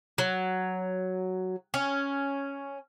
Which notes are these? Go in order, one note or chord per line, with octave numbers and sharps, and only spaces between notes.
F#3
C#4